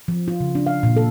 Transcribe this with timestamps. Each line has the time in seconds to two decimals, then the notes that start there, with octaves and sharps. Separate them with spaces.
0.08 F3
0.28 F4
0.40 C#3
0.55 D4
0.67 F5
0.83 A#2
0.97 A4